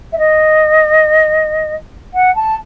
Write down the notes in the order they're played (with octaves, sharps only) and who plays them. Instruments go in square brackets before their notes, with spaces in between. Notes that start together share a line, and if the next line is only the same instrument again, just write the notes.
[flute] E5
D#5
F#5
A5